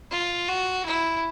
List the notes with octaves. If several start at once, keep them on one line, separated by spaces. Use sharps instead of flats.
F4
F#4
E4